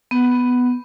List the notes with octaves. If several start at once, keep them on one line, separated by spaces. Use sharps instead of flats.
B3